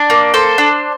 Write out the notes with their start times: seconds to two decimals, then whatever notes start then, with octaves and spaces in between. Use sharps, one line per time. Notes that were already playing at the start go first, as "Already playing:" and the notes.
Already playing: D4 D5
0.10 A#3
0.34 A4 C5
0.58 D4